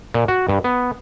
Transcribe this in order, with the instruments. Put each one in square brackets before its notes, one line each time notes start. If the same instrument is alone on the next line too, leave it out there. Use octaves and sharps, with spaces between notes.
[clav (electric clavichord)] A#2
F#4
G2
B3